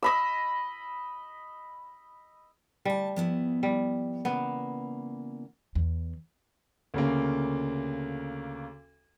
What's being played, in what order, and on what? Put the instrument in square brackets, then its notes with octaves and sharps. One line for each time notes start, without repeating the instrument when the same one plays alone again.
[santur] D#5 B5 E6
[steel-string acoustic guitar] D2 A5 [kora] G3
[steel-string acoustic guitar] F3 B3 E4
[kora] G3
[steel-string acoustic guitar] C#3 E3 A#3 [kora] B3
[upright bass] E2
[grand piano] D2 C#3 A#3